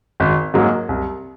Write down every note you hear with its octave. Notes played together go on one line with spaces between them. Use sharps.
G#1
G#2 F#3 A#3
C2